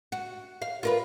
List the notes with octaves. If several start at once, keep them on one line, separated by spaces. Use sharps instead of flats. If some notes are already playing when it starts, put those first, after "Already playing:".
F#4
F5
F4 A#4 B4